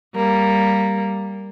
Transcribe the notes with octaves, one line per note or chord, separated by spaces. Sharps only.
G3 A#3